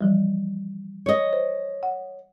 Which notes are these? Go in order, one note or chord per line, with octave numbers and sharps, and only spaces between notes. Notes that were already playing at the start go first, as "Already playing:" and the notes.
E3 F3 G3
C#5 D#5
C5
F#5